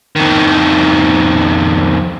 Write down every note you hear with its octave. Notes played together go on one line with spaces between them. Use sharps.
F2 D#3